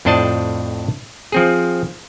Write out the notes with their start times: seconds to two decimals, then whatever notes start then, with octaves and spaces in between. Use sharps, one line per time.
0.05 F2 A2 D4 C5 D#5 A5
1.32 F3 C4 G#4